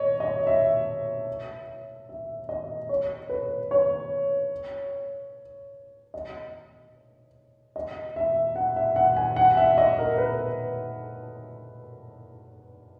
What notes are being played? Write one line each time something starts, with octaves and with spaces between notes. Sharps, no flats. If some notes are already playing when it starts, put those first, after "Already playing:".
Already playing: C#5 D#5
D#5
E5
E5
D#5
C#5
B4
C#5
D#5
D#5
E5
F#5
E5
F#5
G#5
F#5
E5
D#5
A#4
B4